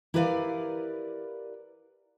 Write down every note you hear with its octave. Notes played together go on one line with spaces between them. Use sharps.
E4 G4 A#4 B4 D5 F5